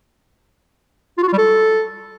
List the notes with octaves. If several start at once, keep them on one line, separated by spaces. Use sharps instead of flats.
F4
F#4
F4
G3
A4